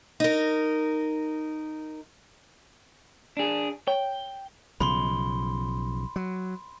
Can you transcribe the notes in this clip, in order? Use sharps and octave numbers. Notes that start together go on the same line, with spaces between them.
D#4 A#4
D4 G#4
C#5 G5
B1 C#3 F3 B5 C6 G7
F#3